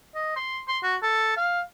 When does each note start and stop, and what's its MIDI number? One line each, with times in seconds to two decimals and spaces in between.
0.15 0.35 75
0.36 0.60 84
0.68 0.78 84
0.83 0.96 66
1.02 1.34 69
1.37 1.61 77